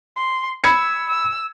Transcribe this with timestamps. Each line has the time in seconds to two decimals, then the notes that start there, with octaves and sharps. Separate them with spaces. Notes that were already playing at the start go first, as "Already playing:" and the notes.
0.16 C6
0.64 B5 E6 G#6 C#7
1.10 E6